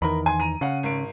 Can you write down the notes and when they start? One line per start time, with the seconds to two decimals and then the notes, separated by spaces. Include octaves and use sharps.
0.02 E2 D#3 A#4 B5
0.26 G#5 C6
0.40 A#5 D#7
0.61 C#3 F5 F#5
0.83 G#1 D7